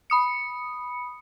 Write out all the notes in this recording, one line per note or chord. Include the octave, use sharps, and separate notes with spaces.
B5 D#6 C#7